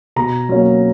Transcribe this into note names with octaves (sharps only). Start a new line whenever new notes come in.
B2 A#5
F#3 A#3 C#4